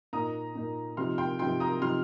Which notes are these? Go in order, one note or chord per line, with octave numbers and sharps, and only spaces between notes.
A#2 A#3 D#4 A#5 D#6
A#2 A#3 D#4
C3 F3 D#4 C6 F6
G5 C6
C3 F3 D#4 G5 C6
A#5 D#6
C3 F3 D#4 C6 F6